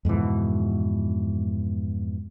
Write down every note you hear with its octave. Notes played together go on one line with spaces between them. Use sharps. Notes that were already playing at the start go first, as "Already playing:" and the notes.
F2 G#2 B2 E3